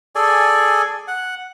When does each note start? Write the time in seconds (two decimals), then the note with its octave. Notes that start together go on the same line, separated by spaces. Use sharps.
0.15 G#4 A4 D5 G#5
1.08 F#5